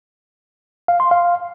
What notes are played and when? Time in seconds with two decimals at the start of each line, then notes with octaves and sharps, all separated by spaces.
0.88 F5
1.00 C6
1.11 F5